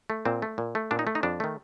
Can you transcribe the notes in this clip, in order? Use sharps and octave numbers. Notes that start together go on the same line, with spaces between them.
A3
A#2 C4
A3
A#2
A3
A#2 D4
D#4
A3
D#4
F2 D4
D#3 A3